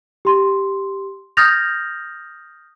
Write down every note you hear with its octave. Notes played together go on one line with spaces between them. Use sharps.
G4 C6
D#6 F6 G6 A6 A#6 F7